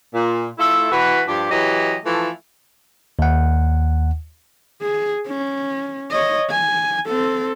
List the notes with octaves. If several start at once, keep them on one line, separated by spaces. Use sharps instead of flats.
A#2
A3 E4 F4 A4
E3 F#4 B4
G2 F3 G4
E3 F#3 G4 D#5
E3 F3 A3
D#2 F#5
G#4
C#4
C#5 D#5
G#5
C4 A4